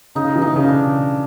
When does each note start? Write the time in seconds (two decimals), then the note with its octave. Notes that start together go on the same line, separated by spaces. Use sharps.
0.15 C#3 D#4
0.36 E3
0.42 D#4
0.56 C#3
0.68 D4